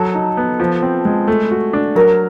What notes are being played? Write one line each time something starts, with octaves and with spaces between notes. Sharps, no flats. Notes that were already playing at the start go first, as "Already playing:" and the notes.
Already playing: F#3 A4
D#4
B3
F3
C4
G#3
A3
F#4
D4
F#3 A#4